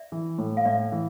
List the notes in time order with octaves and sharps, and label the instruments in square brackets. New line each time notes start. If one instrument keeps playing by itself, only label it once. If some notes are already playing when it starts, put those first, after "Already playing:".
Already playing: [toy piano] D5 E5
[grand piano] E3
A2
[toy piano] F5
[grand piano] A2 [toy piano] D5 E5
[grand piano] E3